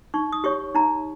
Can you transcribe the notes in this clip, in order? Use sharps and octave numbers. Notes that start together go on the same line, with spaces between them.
D#4 C#6
D#6
G4 C#5 C#6
D#4 A#5